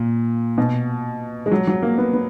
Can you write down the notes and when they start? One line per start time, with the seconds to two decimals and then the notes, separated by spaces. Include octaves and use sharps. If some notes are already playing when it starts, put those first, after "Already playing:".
Already playing: A#2
0.58 B2
1.46 G#3
1.51 F#3
1.67 F#3
1.83 A#3
1.98 B3
2.13 B3